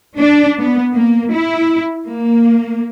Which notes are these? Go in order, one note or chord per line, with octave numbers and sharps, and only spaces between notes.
D4
B3
A#3
E4
A#3